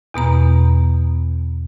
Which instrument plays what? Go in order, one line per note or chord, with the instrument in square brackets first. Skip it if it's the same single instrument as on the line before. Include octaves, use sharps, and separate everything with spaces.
[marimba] E2 B2 B3 A#5